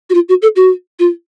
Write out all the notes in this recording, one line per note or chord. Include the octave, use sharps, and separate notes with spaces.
F#4
F4
F#4
A4
F#4
F4